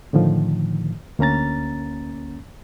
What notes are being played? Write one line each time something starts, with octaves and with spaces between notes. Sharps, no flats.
A2 D3 D#3 F3
D2 A#3 C#4 A#5 A6